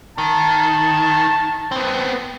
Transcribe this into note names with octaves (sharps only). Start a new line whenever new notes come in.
D#3 A5
B3 C4